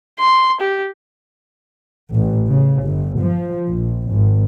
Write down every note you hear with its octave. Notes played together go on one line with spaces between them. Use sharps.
C6
G4
A1
C#3
G1
F3
A#1
G#1